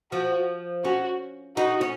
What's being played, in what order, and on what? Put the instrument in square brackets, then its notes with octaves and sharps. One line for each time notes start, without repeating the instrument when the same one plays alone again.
[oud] F3 [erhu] F#4
[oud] C#4 [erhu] F#4
[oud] D#4 [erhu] F#4
[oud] C#4